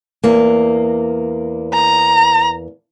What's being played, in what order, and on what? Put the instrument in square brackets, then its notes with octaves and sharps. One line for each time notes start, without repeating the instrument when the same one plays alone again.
[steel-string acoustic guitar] E2 A#3
[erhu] A#5